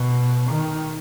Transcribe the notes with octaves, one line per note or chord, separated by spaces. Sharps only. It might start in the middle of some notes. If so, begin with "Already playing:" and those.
Already playing: B2
D#3